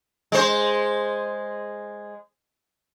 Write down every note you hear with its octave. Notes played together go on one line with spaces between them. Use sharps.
G#3 C5